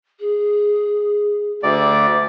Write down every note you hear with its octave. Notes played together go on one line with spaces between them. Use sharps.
G#4
D2 D5